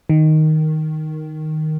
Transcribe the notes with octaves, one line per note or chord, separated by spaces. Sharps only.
D#3